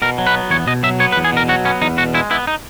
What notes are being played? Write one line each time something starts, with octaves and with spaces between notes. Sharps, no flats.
B2 A#4
F#3
B4
B3
E2 C#5
B2 D#5
F#3 E5
B3 C#5
B4
E2
G#4
B2 A#4
F#3 F#4
B3 C#4
E2 D#4
B2 F#4
G#3 E4
B3 E4
D#4